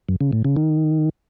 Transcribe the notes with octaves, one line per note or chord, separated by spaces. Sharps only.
F#2
C#3
A2
C#3
D#3